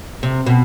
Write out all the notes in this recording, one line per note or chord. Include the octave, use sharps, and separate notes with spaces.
C3
B2